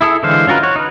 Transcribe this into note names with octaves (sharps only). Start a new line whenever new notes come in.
E4 G#4 A4
D3 E3 G#3 C5 F5
C#4 F4 F#4 A#4 B4
F#4 C#5
D#4 B4